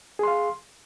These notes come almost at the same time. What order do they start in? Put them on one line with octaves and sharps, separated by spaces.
G#4 C6 F5